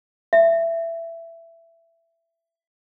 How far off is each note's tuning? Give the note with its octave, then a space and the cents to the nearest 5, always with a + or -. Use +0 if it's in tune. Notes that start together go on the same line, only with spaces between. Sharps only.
E5 +15